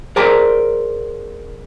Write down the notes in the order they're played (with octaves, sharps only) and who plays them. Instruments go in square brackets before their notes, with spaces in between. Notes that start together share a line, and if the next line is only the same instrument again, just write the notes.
[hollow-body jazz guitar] G#4 A#4 C5 D5 A#5